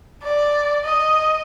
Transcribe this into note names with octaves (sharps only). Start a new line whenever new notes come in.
D5
D#5